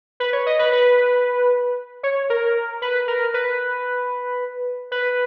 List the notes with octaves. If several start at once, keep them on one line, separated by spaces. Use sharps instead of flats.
B4
C#5
D#5
B4
B4
C#5
A#4
B4
A#4
B4
B4